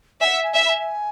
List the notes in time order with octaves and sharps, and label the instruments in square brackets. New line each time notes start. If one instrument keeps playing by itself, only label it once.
[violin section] E5 [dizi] G#5
[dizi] F#5
G#5
[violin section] E5
[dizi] B5
G#5